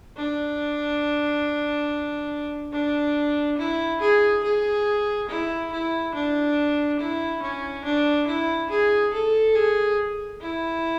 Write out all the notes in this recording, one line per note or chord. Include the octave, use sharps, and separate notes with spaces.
D4
D4
E4
G#4
G#4
E4
E4
D4
E4
C#4
D4
E4
G#4
A4
G#4
E4